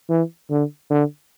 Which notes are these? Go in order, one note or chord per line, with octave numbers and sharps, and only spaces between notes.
E3
D3
D3